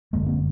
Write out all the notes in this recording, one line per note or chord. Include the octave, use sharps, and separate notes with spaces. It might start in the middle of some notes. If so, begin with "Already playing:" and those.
G1 F#2 D3 G#3 A#3
A#3 C4